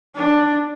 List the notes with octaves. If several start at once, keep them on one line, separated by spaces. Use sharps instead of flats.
D4